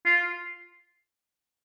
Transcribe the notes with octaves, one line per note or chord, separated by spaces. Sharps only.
F4